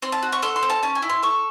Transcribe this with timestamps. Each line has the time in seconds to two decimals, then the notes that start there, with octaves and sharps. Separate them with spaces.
0.02 C4 C6
0.12 A5
0.23 F#4
0.32 C#6
0.43 A4 C6
0.56 C6
0.63 C4
0.70 A5
0.83 C#4 A5
0.95 G#5
1.02 E4
1.10 C6
1.23 A4 C#6